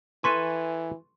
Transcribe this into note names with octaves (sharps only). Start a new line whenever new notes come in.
E3 A4 B4 G#5 C6 C#6